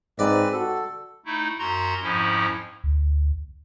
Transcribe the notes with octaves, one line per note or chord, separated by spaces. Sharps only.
G#2 C4 B4 D5
F#4 A4
A3 D#4 E4
F#2 F#4 A#5 C6
F2 G#2 F3 C#4 E4
D2